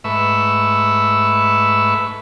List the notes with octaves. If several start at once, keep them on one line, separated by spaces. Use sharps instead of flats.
G#2 A3 B4 E5 C#6 E6